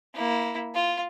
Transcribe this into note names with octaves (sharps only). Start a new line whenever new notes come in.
A#3 E4
F4